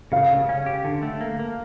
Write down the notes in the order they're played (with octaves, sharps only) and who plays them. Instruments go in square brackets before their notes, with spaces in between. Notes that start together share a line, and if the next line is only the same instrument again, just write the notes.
[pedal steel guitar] C#3 [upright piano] F5
[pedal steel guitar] C#3
C#4
G4
D3
A3
A#3
A#3